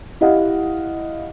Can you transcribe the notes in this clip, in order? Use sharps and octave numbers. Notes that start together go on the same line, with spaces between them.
E4 G4 D#5 F5 F#5